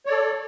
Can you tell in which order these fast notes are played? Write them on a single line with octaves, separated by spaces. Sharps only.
C#5 D5 A4